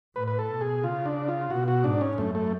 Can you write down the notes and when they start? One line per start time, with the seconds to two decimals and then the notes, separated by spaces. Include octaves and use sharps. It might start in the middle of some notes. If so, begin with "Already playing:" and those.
0.15 A2 B4
0.28 B4
0.39 A4
0.50 B2
0.61 G#4
0.83 C#3 F4
1.06 D4
1.28 F4
1.50 B2 F#4
1.68 F#4
1.84 G#2 D4
2.01 C#4
2.18 F#2 A3
2.35 A3